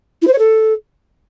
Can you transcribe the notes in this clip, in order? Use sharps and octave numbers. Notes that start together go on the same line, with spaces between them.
E4
C5
C#5
A4